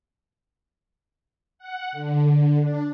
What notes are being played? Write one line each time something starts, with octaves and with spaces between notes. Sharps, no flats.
F#5
D3
D4